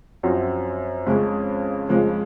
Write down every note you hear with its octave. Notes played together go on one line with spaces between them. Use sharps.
F#2 F3 C4 F#4
F2 C#3 G#3 C#4
F2 C#3 F3 G#3